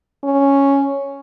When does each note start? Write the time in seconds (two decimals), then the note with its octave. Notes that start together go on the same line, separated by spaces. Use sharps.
0.23 C#4